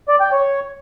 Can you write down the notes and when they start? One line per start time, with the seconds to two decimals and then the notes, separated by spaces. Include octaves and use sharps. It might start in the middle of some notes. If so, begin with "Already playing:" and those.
0.08 D5
0.20 G5
0.32 C#5